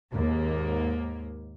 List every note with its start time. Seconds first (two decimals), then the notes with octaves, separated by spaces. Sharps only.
0.13 D#2 G#2 A#3